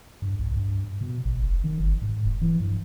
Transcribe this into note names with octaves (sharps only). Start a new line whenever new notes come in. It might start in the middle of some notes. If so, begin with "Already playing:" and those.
G2
C2
G2
B2
A1
F1
D#3
G1
G#2
D#1
E3
G2